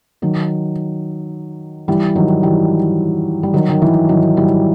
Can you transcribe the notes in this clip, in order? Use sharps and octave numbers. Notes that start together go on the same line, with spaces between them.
D#3 F#3
E3 G3
D#3 F#3
E3 G3
G3
D#3 F#3
D#3
E3
D#3 F#3
E3 G3